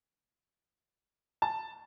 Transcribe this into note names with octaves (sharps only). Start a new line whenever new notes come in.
A5